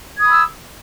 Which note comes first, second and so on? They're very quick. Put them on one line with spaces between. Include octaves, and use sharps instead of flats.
G#6 D#6 B5 E6